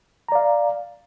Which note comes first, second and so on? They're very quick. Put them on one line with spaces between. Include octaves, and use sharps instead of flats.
A#5 D5 F5